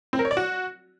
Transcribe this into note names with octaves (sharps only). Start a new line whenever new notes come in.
C4
A#4
C#5
D5
F#4